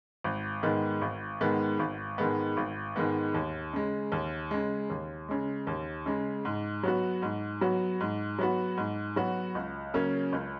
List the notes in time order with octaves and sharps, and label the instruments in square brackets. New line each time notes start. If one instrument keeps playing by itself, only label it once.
[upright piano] G#1
G#2 D#3 G#3 B3
G#1
G#2 D#3 G#3 B3
G#1
G#2 D#3 G#3 B3
G#1
G#2 D#3 G#3 B3
D#2
C#3 G#3
D#2
C#3 G#3
D#2
C#3 G#3
D#2
C#3 G#3
G#2
F#3 B3 F#4
G#2
F#3 B3 F#4
G#2
F#3 B3 F#4
G#2
F#3 B3 F#4
C#2
C#3 F#3 A#3 C#4
C#2